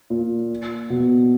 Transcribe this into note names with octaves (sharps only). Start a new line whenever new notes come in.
A#2
B2